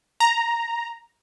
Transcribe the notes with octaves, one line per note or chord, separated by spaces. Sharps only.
A#5